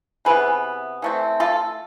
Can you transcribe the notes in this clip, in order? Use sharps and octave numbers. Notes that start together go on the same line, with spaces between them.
C3 E3 B3 G#4 B4
E3 A3 C4
F4 A4